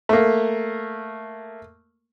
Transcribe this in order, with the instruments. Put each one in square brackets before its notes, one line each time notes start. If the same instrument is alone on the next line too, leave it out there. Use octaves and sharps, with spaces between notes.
[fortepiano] A3 A#3